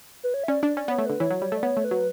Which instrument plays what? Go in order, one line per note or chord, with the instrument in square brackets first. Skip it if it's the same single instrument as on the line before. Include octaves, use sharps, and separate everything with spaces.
[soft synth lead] B4
C#5
E5
[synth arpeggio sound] C#4 [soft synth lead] D5
[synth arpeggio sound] D4 [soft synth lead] D5
[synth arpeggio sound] C#4 [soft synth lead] D5
[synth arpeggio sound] B3
[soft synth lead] C#5
[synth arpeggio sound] A3
[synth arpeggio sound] D3 [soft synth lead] B4
[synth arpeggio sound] E3 [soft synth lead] C#5
[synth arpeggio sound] F#3
G3
A3
[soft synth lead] D5
[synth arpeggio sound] B3 [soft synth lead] C#5
[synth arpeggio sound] A3
[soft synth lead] B4
[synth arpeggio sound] F#3